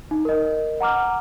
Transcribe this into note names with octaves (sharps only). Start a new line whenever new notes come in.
D#4
A#4 D#5
F#5 A#5 D6 F6